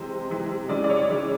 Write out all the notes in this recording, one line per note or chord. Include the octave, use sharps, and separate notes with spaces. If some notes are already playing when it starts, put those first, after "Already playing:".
Already playing: C3 E3 G#3 C5
C3 E3 G#3
C#3 E3 G#3 D5
D5
C#5
C#3 E3 G#3